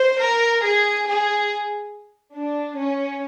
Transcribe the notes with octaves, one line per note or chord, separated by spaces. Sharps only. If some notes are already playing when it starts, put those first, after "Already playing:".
Already playing: C5
A#4
G#4
G#4
D4
C#4